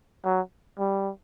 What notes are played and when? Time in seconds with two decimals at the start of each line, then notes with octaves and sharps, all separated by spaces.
0.25 F#3
0.79 G3